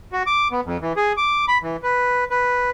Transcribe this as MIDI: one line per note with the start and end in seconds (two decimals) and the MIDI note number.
0.12 0.23 66
0.27 0.48 86
0.51 0.61 59
0.65 0.77 41
0.81 0.93 52
0.96 1.13 68
1.17 1.45 86
1.48 1.58 83
1.63 1.76 52
1.83 2.24 71
2.30 2.70 71